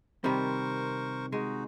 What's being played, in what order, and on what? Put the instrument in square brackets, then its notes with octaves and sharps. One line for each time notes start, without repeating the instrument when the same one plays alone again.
[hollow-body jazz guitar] C3 [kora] D#3 G3 [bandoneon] A#4 C5 C#6
[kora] G#3 [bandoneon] D#4 F#4